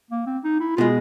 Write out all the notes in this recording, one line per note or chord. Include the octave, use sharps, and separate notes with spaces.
A#3
C4
D#4
E4
B2 G#3 F4